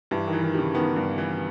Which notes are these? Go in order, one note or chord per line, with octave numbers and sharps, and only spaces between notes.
G2 E3
D#3
E3
D#3
C#3 G3
D#3 B3
G2
E3